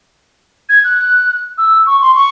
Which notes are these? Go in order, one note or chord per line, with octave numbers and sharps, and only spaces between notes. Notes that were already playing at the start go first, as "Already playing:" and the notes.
G#6
F#6
E6
C#6
C6
C#6